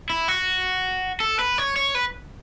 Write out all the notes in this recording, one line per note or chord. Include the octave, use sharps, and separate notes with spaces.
E4
F#4
A4
B4
C#5
C#5
B4